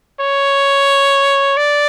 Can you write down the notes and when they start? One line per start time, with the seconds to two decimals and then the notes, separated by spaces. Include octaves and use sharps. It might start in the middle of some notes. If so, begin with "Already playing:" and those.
0.20 C#5
1.57 D5